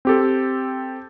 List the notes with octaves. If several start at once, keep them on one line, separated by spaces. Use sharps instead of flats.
C4 G4 A4